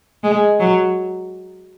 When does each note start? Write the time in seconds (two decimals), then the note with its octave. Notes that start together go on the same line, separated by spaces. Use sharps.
0.24 G#3
0.60 F#3